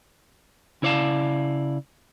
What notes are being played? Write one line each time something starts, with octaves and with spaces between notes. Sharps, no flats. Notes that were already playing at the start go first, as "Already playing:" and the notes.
C#3 E4 C#5 D5 F5 A5